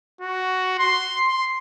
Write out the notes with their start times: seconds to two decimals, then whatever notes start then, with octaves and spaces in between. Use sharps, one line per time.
0.21 F#4
0.79 C6
1.28 C6